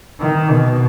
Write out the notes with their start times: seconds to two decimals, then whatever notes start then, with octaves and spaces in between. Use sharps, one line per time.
0.20 D#3
0.51 B2